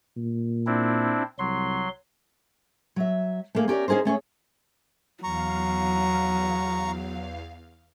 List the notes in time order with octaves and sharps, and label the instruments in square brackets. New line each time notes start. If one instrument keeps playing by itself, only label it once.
[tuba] A#2
[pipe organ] C4 D4 E4
[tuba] C2 [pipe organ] F#3 C6
[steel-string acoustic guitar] F#3 E5
A3 A#3 G#4
C#4 G4 A#4 D5
C#4 D#4 G#4 A#4 C5
A3 C#4 G#4 C#5
[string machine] E2 F5 [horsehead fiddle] F#3 [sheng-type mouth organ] A#5 C#6